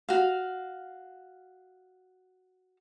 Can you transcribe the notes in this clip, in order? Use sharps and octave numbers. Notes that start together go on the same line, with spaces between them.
F#4 F5